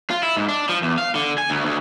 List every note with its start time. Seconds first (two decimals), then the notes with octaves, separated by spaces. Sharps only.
0.10 F4
0.23 E4
0.37 G#2
0.49 D4
0.69 F3
0.82 E2
0.98 F5
1.15 D3
1.38 G#5
1.50 D2
1.65 D2